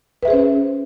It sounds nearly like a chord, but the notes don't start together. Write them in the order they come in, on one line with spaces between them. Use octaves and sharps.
B4 E5 G#4 C5 C#4